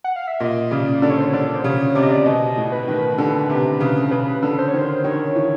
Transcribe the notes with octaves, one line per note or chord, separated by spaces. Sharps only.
F#5
F5
E5
A#2 D#5
C#3 D5
D3 D5
C#5
C5
C#5
D3 D5
C5
C#3 C#5
C3 D5
D#5
D5
B2 D#5
A2
B4
D#3
D3
C3
C#3
C#3 B4
D3
C5
C#5
D#3 C5
D#3 C#5
E3